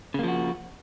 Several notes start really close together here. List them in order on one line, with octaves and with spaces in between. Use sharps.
C#3 A#3 F3 F#4